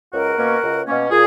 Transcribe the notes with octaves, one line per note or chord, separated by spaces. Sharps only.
C#2 F#4 A#4
B2 A#3 C#4
C#2
B2 A#3 C#4
A#2 F4 G#4